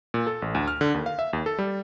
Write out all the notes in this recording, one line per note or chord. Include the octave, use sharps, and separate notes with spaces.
A#2
A4
A1
D2
F6
D3
D#2
F5
E5
D#2
A4
G3